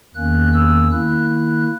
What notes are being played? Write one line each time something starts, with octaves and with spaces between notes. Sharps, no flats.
E2 D#3 A#3 C#4 F#6
E6
D#3 A#3 E4 F#6
F#6